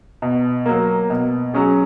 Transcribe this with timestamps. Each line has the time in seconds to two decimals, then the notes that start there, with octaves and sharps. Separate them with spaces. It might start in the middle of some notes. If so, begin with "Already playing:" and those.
0.22 B2
0.66 F#3 A#3
1.10 B2
1.54 F#3 C#4 G#4